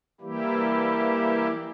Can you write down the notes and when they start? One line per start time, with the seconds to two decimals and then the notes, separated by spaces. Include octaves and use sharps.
0.21 E3 G3 A#3 E4 G4